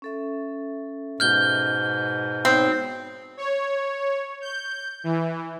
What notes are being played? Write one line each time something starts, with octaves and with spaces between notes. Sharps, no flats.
C#4 A4 E5
G#2 B2 F6 G6 G7
B3 C4 D#4 C#5
C#5
G6
E3